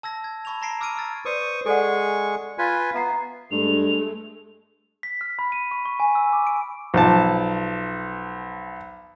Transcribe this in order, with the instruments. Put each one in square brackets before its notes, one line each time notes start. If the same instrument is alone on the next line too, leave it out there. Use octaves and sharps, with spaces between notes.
[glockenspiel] A5 E6 G#6 A#6
G#6
A5 B5 C#6 G#6 F7
A#5 C#6 A#6 C7 D7 E7
D6 E6 F6 G#6 D7 D#7
E6 F6 A6
[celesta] B4 D5 [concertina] C5 C#6 D#6
[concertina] G#3 G#4 C#6 [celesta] A4 D5 F#5
[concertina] F4 B4 G#5
[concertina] B3 [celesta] E5 A#5 C7
[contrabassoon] G2 [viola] G#3 A3 [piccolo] F7
[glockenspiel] B6
F6
B5
D#7
C#6
C#6
G#5
E6
D6
D7
[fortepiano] B1 F3 A5